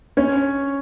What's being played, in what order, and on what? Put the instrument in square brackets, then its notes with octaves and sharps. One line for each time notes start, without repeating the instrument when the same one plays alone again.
[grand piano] C#4 C#5